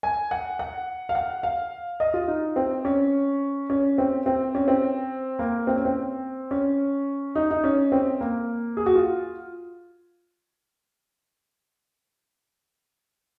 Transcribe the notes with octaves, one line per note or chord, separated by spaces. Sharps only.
G#5
F#5
F#5
F5
F#5
F5
D#5
F4
D#4
C4
C#4
C#4
C4
C4
C#4
C4
A#3
C4
C#4
C4
C#4
D#4
D#4
C#4
C4
A#3
G#4
F#4
F4